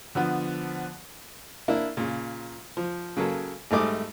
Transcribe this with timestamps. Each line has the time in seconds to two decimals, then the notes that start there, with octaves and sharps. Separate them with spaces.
0.15 D3 F3 B3
1.68 A#3 D4 E4
1.97 A#2 C#3
2.77 F3
3.17 C#3 F#3 A#3 A4
3.71 G#1 G3 A3 D6 D#6